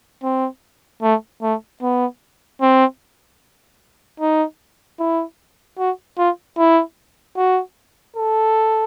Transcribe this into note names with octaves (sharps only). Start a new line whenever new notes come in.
C4
A3
A3
B3
C4
D#4
E4
F#4
F4
E4
F#4
A4